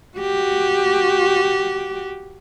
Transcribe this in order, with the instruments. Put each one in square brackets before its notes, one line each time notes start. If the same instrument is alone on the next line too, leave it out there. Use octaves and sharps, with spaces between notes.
[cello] F#4 G4